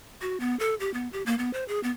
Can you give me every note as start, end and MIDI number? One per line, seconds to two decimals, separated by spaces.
0.21 0.38 66
0.40 0.57 59
0.59 0.75 69
0.80 0.92 67
0.94 1.08 59
1.13 1.22 67
1.26 1.37 58
1.38 1.52 59
1.53 1.64 72
1.68 1.82 68
1.83 1.90 59